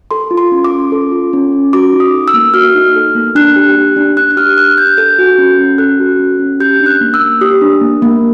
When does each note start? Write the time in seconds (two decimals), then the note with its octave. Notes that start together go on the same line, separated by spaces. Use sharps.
0.11 A4 C6
0.31 F4
0.37 C6
0.52 C#4
0.64 D6
0.72 C#4
0.92 A4
1.12 F4
1.33 C#4
1.52 C#4
1.73 F#4 D6
1.93 D#4
2.00 D#6
2.13 A4
2.28 E6
2.34 A#3
2.54 F#4 F6
2.75 D#4
2.95 A4
3.15 A#3
3.35 D4 F#6
3.56 G4
3.76 G4
3.96 D4
4.17 D4 F#6
4.30 F#6
4.37 G4 F6
4.57 G4 F#6
4.78 D4 G6
4.97 A4 G6
5.18 F#4
5.38 C#4
5.58 C#4
5.78 A4 F#6
5.99 F#4
6.20 C#4
6.39 C#4
6.60 G4 G6
6.80 D4
6.86 F#6
7.01 A#3
7.14 E6
7.21 A#3
7.41 G4 D#6
7.61 D4
7.81 A#3
8.02 A#3